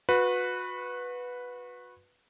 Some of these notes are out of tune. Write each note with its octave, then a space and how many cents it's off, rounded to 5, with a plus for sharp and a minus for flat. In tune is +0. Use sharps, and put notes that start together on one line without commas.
F#4 -30 B4 +0